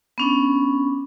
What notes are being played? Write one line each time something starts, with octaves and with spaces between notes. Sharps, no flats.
B3 C#4 D4